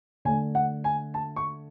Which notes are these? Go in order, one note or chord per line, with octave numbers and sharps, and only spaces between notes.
D3 A3 D4 G#5
F#5
G#5
A5
C#6